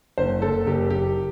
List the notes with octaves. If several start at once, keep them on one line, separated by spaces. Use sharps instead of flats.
F#1 C5
F#1 A4
F#1 G4
F#1 G4